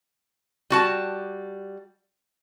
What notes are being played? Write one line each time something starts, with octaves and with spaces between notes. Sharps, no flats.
G3 F#4 A5